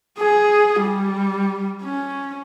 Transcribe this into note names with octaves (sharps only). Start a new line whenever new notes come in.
G#4
G3
C#4